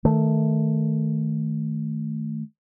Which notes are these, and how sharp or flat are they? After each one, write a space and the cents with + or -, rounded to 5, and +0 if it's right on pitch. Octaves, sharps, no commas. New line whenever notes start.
D#3 +0 A3 +0